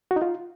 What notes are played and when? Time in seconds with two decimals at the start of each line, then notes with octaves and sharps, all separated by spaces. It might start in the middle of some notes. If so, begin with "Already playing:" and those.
0.11 F#4
0.16 D#4
0.22 F4